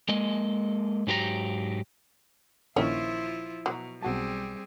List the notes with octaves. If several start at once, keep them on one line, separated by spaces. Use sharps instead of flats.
G#3 A#3 D#5
G#2 F#3 G4 G#4 A#5
A#1 A#2 D#3 F3 C#4 E4 F4 C#5
B2 F#3
B1 G3 C4 F#4 G#4 A5